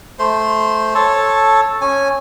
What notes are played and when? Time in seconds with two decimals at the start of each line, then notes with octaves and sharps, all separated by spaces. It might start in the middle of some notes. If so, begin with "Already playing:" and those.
0.19 A3 C5 C6
0.95 A4 C#5 A5
1.81 C#4 G#5